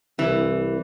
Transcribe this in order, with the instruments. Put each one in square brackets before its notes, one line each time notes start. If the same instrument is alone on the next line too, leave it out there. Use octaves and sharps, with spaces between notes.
[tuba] C2 [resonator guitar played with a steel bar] E3